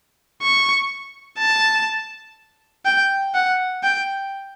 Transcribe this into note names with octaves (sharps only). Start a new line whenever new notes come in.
C#6
A5
G5
F#5
G5